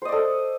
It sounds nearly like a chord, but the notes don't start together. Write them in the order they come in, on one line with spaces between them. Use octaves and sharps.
C5 D#5 D5 A4